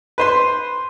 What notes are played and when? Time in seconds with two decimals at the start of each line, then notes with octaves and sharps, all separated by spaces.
0.18 B4 C5 C6